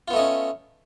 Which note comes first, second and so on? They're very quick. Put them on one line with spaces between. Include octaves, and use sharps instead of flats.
F4 B3 A3 D#5 C#4